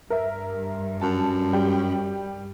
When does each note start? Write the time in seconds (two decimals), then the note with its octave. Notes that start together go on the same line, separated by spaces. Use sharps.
0.10 G2 A#4 E5
1.01 F#2 A5
1.53 G3 G5